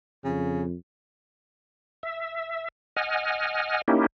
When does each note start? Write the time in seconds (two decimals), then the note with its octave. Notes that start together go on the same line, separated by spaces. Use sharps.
0.24 F2 C#3
2.03 E5
2.97 D#5 F#5 G#5 F6
3.88 A#3 C#4 D#4 E4 G4